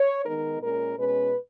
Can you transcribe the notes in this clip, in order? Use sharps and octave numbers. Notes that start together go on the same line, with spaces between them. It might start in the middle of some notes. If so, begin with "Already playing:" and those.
Already playing: C#5
D#3 G#3 B3 D#4 A#4
A#2 G#3 C#4 A#4
B2 G#3 C#4 B4